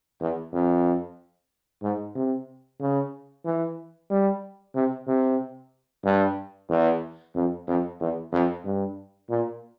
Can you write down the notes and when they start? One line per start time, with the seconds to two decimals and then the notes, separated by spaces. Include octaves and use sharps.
0.21 E2
0.53 F2
1.83 G#2
2.15 C3
2.80 C#3
3.45 E3
4.10 G3
4.75 C3
5.07 C3
6.05 G2
6.69 E2
7.35 F2
7.67 F2
8.00 E2
8.32 F2
8.65 G2
9.30 A#2